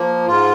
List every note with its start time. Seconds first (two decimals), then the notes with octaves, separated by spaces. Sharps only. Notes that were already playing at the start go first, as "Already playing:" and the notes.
Already playing: F3 A#3
0.27 G#2 F4